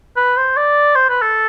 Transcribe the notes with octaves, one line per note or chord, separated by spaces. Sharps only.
B4
C5
D5
C5
B4
A4